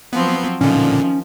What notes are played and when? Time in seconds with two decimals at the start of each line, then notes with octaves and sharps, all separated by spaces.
0.13 F3 F#3 B3 C4
0.61 A#2 D3 D#3 F3 C#4